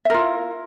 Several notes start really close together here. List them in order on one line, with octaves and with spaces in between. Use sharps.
E5 A#4 F4 E4